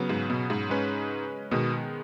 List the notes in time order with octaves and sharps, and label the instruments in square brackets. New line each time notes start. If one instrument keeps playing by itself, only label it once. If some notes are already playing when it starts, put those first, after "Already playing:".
Already playing: [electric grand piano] C#3 F#3 B3
[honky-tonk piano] G#2
B2
G#2
[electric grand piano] G#3 C#4 B4
[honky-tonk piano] B2 [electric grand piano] D#3 G#3 B3